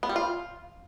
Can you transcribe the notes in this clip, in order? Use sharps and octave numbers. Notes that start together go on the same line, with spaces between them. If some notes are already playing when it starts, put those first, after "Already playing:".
B3
G3
F4